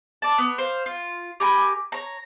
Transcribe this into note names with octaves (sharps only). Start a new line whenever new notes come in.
D5 A5
B3
C5 F5
F4
G4 A#4 G#5 B5
C#5 A#5